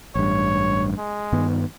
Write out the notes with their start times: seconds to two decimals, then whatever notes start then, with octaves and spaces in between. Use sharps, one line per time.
0.15 A1 G2 C#5
0.98 G#3
1.32 G2 D#3 B3